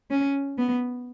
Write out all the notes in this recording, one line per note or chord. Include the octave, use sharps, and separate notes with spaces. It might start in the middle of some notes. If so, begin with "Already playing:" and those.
C#4
B3